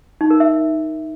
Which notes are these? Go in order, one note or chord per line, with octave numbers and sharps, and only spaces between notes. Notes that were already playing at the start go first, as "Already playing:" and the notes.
D#4
A#4
E5